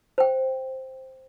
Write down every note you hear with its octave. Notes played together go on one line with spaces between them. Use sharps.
C5 G5